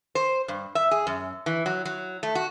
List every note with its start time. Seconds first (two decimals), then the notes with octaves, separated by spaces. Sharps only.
0.15 C5
0.48 G2
0.75 E5
0.91 G#4
1.07 F#2
1.46 E3
1.66 F#3
1.85 F#3
2.23 A3
2.35 F#4